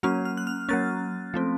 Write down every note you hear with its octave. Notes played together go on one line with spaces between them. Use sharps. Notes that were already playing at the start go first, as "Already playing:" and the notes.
F#3 A#3 C#4 F6
F6
F#6
F6
F#3 A#3 C#4 A6
F3 A3 C4